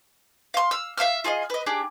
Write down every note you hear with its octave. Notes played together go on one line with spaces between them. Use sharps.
F5 C6
F5 E6
E5 F5 E6 F6
F4 G#4 D5 D#5
B4 D#5
D4 G4 G#4